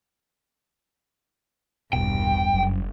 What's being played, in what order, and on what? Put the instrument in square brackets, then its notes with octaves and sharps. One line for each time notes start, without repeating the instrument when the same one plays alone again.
[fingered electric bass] E1 B2 [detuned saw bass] C2 [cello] G2 [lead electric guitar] G5
[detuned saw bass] F#1 [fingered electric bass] F#2